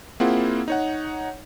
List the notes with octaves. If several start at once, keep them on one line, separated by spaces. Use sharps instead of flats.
A#3 C4 E4 F4 G#4 F#5
D#4 C#5 F#5